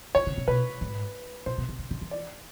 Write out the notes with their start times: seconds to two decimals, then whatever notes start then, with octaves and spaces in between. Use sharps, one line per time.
0.15 D3 C#5
0.27 C#3
0.37 C3
0.48 B2 B4
0.81 G#2
1.46 A#2 C5
1.58 B2
1.69 C3
1.79 C#3
1.91 D3
2.01 E3
2.11 D5